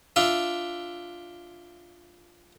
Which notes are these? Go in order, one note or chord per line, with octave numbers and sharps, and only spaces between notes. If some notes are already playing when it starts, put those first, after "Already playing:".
D4 F4 E5